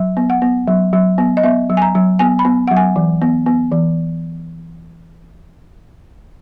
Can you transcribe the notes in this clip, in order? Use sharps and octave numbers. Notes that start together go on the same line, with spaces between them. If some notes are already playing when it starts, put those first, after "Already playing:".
Already playing: F#3
B3
F#5
B3
F#3
F#3
B3
D#5
B3 E5
F#3
G#5
A#5
F#3
B3 G#5
B5
B3
F#3 F#5
G#5
E3
B3
B3
E3